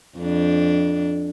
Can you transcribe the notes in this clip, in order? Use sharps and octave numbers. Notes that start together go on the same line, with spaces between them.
F2 D4